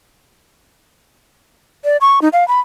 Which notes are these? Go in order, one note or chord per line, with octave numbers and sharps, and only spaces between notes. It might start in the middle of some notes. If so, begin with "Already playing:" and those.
D5
C#6
D#4
F5
B5